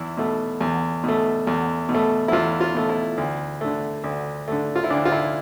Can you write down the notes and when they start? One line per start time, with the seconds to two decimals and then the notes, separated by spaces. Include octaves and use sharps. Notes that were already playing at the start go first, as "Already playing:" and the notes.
Already playing: E2 E4
0.17 B2 A3
0.60 E2
1.04 B2 A3
1.47 E2
1.89 B2
1.94 A3
2.28 E4
2.32 E2 F4
2.61 F4
2.75 B2 A3
2.89 E4
3.18 D2
3.61 D3 A3
4.04 D2
4.48 D3 A3
4.76 F4
4.84 E4
4.90 D2 D4
5.05 F4
5.12 E4